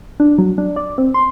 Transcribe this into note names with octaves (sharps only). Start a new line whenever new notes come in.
D4
F#3
D4
D5
C4
C6